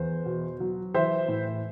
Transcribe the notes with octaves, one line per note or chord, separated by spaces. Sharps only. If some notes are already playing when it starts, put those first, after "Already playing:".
Already playing: E2 C5
B2
F#3
E3 C5 E5
A2